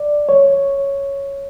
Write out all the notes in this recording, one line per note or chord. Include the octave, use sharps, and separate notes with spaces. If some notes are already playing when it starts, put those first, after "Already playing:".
Already playing: D5
C#5